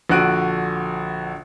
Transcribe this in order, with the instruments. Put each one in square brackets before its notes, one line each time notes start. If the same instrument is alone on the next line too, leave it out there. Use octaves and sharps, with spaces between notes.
[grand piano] A#1 D3 F#4 F#6 D7 D#7